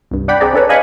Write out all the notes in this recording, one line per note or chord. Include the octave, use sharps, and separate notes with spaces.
C2 G2
D5 F#5 G5 B5
C4 G#4 D5 A#5
C#4 D4 A4 B4 C#5
D#5 F5 G#5 B5 C#6